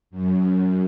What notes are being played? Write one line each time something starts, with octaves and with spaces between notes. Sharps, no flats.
F#2